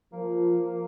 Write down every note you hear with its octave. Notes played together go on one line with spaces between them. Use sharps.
F3 A#3